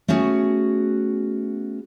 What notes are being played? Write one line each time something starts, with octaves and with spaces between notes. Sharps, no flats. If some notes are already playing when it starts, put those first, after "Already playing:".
A3 B3 C#4 F#4 G#4